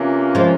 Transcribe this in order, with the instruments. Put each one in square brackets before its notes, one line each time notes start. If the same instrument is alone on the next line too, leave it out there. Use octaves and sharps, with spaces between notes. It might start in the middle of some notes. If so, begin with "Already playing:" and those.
Already playing: [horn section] C3 E3 A#3 C#4 F4
[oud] F3 G#3